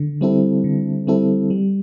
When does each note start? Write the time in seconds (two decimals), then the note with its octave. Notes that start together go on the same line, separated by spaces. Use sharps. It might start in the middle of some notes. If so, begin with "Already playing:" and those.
Already playing: D3
0.21 G3 C4 E4 A4
0.64 D3
1.07 G3 C4 E4 A4
1.50 G3